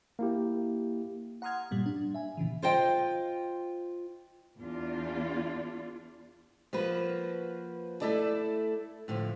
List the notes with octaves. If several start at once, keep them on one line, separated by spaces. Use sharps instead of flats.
A#3 E4 G4
F#5 A#5 C6 D#6 F6 G#6
G2 A#2 G3
D4
E5 G#5
A#2 C#3 E3
F4 C5 D#5 G5
E2 D4 F4
F3 A#3 F#4 B4
A3 E4 A4 D5 A5
A2 D3 F3